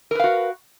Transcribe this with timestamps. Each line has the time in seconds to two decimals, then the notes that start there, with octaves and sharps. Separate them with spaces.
0.11 A#4
0.15 B4
0.19 F5
0.24 F#4